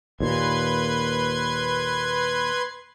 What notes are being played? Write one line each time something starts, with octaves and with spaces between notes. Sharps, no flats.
D#2 A#2 B4 C6 G#6